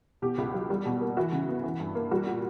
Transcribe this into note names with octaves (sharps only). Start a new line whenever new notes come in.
B2 G4
C#2
F#3
G3
B2
A#3
E3 F#4
C#3
B3
E3
G2
A#3
G3 F#4
A#2